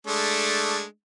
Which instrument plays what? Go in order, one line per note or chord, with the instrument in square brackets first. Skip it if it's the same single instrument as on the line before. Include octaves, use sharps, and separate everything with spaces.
[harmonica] G#3 A3 D4